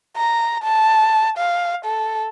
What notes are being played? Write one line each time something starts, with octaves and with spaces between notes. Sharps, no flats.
A#5
A5
F5
A4